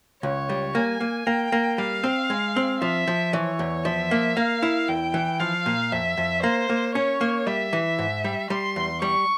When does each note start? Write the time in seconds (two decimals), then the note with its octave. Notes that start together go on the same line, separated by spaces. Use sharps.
0.23 C#2 C#5
0.49 G3
0.75 A#3 G#5
1.01 A#3
1.27 A#3 G5
1.52 A#3
1.78 G3 F5
2.04 C4
2.30 G#3
2.56 C4
2.82 F3 E5
3.07 F3
3.33 E3 C#5
3.59 E2
3.85 F3 E5
4.11 A#3
4.37 A#3 F5
4.63 E4
4.88 E2 G5
5.14 E3
5.40 F3 F5
5.66 A#2
5.92 F2 E5
6.17 F2
6.43 A#3 C5
6.69 A#3
6.95 C#4 C#5
7.21 A#3
7.47 G3 E5
7.73 E3
7.99 G#2
8.24 G3
8.50 G3 C6
8.76 E2
9.02 G3 C#6